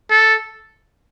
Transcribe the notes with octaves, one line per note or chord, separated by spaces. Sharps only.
A4